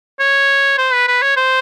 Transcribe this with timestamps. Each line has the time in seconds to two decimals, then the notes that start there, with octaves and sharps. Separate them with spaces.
0.20 C#5
0.78 C5
0.93 B4
1.08 B4
1.22 C#5
1.37 C5